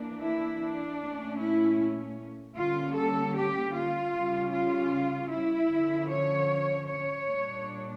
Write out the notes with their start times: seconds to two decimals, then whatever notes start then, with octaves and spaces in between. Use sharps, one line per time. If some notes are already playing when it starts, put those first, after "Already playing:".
Already playing: E3 A#3 D4
0.21 E4
0.61 D4
1.00 A#2 A3 C#4
1.39 E4
2.57 D3 G3 A#3 C#4 F4
2.96 A4
3.36 G4
3.75 F4
4.14 C#3 G3 C#4
4.54 F4
5.32 E4
5.71 D3 F3 C#4
6.10 C#5
6.88 C#5
7.28 A#2 G3 D4